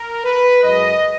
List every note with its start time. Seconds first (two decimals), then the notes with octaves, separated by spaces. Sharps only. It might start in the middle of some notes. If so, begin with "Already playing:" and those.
Already playing: A#4
0.25 B4
0.64 F#2 C#3 G#3 D#5